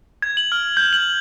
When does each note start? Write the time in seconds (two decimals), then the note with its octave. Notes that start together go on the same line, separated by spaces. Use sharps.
0.22 G#6
0.37 F#7
0.52 F6
0.77 G6
0.93 F#7